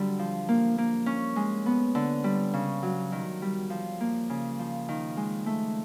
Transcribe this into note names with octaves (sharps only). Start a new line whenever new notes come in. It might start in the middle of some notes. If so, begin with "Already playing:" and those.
Already playing: D3 F#3 G3
F3
A#3
A#3
C#4
G#3
B3
D3
G3
C#3
F#3
D#3
G3
F3
A#3
C#3
F3
D#3
G#3
A3